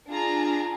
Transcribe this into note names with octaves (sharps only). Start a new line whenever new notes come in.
D4 F4 G#4 A#5